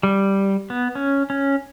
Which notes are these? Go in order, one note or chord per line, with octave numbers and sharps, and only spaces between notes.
G3
B3
C#4
C#4